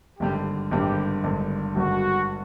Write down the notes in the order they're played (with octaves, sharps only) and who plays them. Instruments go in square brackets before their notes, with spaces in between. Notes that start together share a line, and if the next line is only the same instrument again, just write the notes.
[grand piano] G#1 G2 D3 [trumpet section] G4
[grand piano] G#1 G2 D3 [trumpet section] G4
[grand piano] G#1 G2 D3
[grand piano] G#1 G2 D3 [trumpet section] F#4